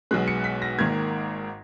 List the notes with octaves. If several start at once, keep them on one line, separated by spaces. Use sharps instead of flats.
B1 B2 G#3 F#6
C#7
B6
A#6
G#1 G#2 D#3 A#3 G#6